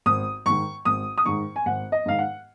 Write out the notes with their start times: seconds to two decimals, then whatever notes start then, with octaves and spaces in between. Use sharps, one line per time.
0.06 G#1 D#6
0.46 G#2 D#3 C#6
0.85 G#1 D#6
1.18 D#6
1.26 G#2 D#3 C#6
1.56 G#5
1.66 G#1 F#5
1.92 D#5
2.06 G#2 D#3 F5
2.19 F#5